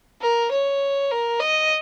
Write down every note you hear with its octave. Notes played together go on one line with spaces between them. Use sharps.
A#4
C#5
A#4
D#5